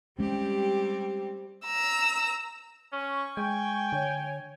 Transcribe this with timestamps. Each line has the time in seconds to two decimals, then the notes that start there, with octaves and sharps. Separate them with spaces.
0.19 G3 G#3 C4 C#4 G4
1.66 A#5 E6
2.93 C#4 C#6
3.37 G#3 G5 G#5
3.92 D3 C#5